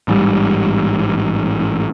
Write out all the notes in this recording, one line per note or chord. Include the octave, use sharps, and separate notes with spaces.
A1 G#2 G3